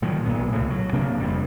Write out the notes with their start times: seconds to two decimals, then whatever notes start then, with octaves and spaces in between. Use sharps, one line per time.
0.02 A#2 D#3 F3 F#3
0.26 B1 A#2 B3
0.52 C#2 A2
0.70 F#3
0.93 C3 A#3 D4
1.20 F1 F2 G3